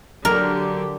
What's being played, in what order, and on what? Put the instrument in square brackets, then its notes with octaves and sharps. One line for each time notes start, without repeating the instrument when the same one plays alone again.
[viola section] D3 G4 [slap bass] F#3 [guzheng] A#4